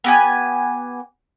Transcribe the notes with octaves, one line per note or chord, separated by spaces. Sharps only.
B3 G4 G#5